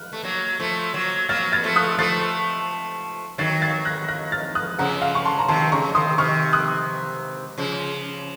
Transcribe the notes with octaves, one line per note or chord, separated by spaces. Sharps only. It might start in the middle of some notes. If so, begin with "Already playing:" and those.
Already playing: F6 F#6
A3
F#3 A#3
F3 A3
F#3 A#3
F#3 A#3 F6 A6
F6 A6
F3 A3
D#6 F#6
F3 A3 A6 C7
D#3 F#3 A6 C7
A6 C7
F#6 A#6
F#6 A#6
F6 A6
D#6 F#6
C#3 F3 F#5 A#5
F5
C#6
A5 C6
A#5
C3 D#3 A5 C6
C#3 A#5 C#6
C3 D#3 C6 D#6
C3 D#3 C#6 F6
D#6 F#6
C#3 F3